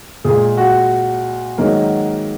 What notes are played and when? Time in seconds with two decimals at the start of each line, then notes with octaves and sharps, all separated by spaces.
0.24 A#2 G#3 G#4
0.57 F#4
1.58 G#2 D#3 F#3 A#3